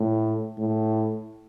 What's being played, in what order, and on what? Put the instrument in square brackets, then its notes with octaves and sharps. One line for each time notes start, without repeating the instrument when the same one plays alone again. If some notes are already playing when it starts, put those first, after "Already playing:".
Already playing: [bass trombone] A2
A2